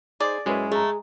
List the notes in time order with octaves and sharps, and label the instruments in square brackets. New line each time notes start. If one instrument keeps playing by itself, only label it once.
[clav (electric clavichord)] D#4 C5 [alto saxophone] G#4 [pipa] D5
[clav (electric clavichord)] F#2 C#4 E4 [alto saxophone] G#3 [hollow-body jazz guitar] F#4 B4
[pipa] A3 [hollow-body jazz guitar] G#4 A#5